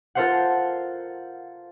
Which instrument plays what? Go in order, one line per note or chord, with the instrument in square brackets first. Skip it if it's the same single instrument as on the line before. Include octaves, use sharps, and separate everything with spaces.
[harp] F4 A4 A#4 C5 F5 F#5